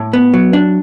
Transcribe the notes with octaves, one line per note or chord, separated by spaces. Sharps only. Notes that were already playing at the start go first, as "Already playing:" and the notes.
Already playing: A2
B3
F#3
D4